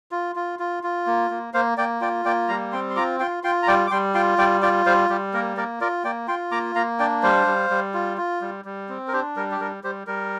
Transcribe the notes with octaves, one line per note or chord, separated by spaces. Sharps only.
F4
F4
F4
F4
A#3
A#3
A#3 C5 F5
A#3 D5 G5
F4 D5 G5
A#3 D5 G5
G3 F5 A#5
C4 G5 C6
C6
F4 A#5 D6
F4 G5 C6
F4 G5 C6
A#5
G3 D5 G5
D6
G3 G5 C6
F4 G5 C6
G3 D5 G5
F4 D5 G5
G3 C5 F5
G3 G4
A#3 A#4
A#3 A#4 D5
F4 A#4 D5
A#3 D5 G5
F4 G5 C6
A#3 A#5 D6
A#3 F5 A#5
D4 D5 G5
G3 C5 F5
G3
G3
F4
F4
G3
G3
C4
A#4
D4 G4 C5
G3 A#4
G4
G3 A#4
G3 G4 C5
G3 A#4